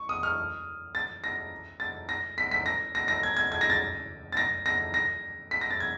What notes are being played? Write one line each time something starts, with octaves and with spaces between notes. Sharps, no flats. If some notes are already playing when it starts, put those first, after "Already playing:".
Already playing: C#6
D#6
F6
A6
A#6
A6
A#6
B6
B6
A#6
A#6
A#6
G#6
G#6
G#6
A#6
A6
A6
A#6
A#6
A#6
B6
A#6
A6
G#6